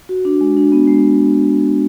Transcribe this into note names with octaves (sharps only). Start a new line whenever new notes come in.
F#4
D4
G#3
D4
B3
G#3